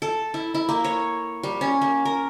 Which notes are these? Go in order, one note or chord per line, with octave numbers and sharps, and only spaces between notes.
A4
E4
E4
A#3
C#5
G3
C#4
A#3
A#4